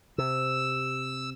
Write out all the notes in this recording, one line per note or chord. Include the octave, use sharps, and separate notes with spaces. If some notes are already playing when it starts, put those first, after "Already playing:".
C3 E6